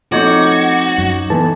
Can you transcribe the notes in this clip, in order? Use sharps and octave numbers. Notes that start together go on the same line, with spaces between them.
F3 A3 C4 D#4 F#4 C#5 D6
F#2
E3 A3 B3 A5